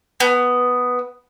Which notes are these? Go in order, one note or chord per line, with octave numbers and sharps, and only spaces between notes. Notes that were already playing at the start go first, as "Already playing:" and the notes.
B3